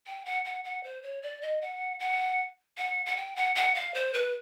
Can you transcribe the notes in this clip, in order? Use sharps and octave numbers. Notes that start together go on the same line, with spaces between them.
G5
F#5
F#5
F#5
C5
C#5
D5
D#5
F#5
F#5
F#5
F#5
G5
F#5
F#5
F5
C5
B4